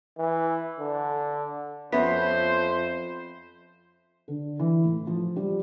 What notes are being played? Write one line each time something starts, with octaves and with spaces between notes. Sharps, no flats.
E3
D3
F2 B3 C#4 C5 E5 B5 B6
D3
E3
A2
F3
G3